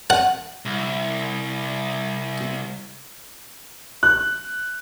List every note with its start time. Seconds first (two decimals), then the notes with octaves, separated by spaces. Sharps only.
0.10 F#5
0.65 C2
4.03 F#6